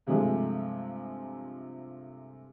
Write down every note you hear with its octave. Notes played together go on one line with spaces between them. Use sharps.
G2 C3 F3 G#3 A3